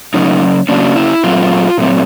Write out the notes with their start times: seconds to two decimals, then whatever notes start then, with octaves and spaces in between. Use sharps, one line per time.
0.14 C#3 F#3 A#3 C#4 D#4
0.69 C#3 F#3 A#3 C#4 D4
0.96 E4
1.23 A#2 F#3 A3 C4 F4
1.78 A#2 F#3 A3 C4